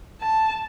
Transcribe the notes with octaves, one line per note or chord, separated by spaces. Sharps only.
A5